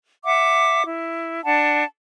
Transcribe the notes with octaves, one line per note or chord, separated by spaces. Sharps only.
E5 F#5 D6
E4
D4 F#5 A5